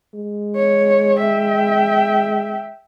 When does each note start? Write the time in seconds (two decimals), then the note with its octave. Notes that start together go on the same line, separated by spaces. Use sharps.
0.14 G#3
0.55 C#5
1.19 E5 G5